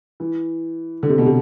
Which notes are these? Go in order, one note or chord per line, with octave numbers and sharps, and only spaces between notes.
E3
D3
C3
B2
C3